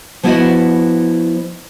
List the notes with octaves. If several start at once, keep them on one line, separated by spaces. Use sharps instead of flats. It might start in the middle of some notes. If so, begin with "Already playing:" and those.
F3 B3 E4 F#4 D5 D#5